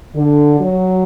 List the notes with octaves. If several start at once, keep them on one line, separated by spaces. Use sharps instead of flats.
D3
F#3